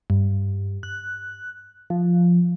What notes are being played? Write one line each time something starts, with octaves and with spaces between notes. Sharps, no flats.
G2
F#6
F3